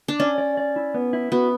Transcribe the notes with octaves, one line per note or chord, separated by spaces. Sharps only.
D4
C#4 D5
D5
D5
E4
B3
E4
B3 F#4